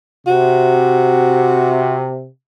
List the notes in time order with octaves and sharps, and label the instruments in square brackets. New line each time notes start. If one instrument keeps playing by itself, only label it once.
[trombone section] C3 [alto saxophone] F#4